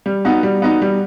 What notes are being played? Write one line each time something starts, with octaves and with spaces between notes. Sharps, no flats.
G3
B3 D#4 F#4
G3
B3 D#4 F#4
G3